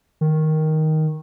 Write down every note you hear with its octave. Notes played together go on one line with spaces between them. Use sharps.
D#3